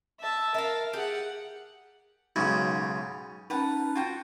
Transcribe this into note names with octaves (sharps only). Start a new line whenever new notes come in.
E5 A5
A#4 E5 F5 A5
G4 G#4 F#5
B1 G#2 C#3
C#4 D#4 B4 F#5 A5
F4 F#4 G5